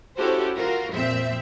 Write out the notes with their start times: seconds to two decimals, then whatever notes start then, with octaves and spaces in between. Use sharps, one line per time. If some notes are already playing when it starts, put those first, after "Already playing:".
0.18 C#4 E4 F#4 G4 A4 C5
0.57 F4 F#4 A#4
0.93 F2 A#2 C4 E5